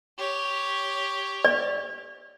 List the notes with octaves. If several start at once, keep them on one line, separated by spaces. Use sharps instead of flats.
G4 C#5
D5